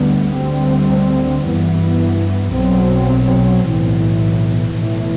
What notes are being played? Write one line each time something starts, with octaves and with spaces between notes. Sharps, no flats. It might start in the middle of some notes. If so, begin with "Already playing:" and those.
Already playing: D2 D3 G3 B3
D2 D3 G3 C4
G2 E3 B3
B1 B2 F#3 C4
B1 A2 E3
B1 A2 E3 A3